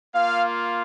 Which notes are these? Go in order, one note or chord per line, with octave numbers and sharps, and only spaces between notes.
A#3 F4 F5